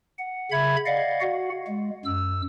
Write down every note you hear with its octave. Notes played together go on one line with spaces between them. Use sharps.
F#5
C#3 E5 B5 G#6
D5 D#5 F5 F#5
F#4 F#5
G#3
F#2 E6